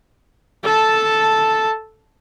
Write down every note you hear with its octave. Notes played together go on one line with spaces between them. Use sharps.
A4 A5